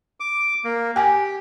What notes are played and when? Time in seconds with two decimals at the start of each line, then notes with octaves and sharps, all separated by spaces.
0.20 D6
0.64 A#3
0.96 G4 G5 G#5